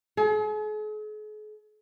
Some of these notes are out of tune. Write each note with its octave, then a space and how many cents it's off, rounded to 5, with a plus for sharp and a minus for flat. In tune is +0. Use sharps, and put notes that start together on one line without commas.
G#4 +45